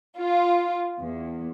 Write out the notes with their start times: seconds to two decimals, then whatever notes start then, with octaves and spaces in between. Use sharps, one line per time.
0.18 F4
1.00 E2